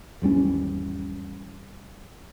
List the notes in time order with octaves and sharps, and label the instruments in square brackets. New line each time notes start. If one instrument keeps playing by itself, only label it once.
[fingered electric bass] G#1 E2 G3 C#4